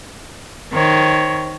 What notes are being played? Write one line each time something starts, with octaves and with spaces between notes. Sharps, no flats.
D#3 C5 C#5